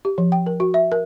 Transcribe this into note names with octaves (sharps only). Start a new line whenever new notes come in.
G4
F3
G5
A#4
F#4
E5
A#4